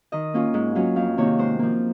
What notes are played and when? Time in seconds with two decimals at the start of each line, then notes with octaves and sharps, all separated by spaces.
0.12 D#3 D#5
0.34 A#3 C#4 F4
0.54 G#2
0.75 F#3 C#4 F4
0.96 F2 F5
1.17 C3 D#3 A#3 C#5
1.38 G#2 C5
1.59 F3 A#3